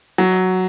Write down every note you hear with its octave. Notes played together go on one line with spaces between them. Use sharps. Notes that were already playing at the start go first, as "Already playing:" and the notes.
F#3